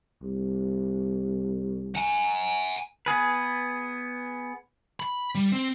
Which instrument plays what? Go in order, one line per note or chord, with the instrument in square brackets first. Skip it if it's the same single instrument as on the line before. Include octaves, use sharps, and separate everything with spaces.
[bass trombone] C2
[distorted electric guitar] F#5 G#5
[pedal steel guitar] B3 G#4 B4
[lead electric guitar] B5
G3
C4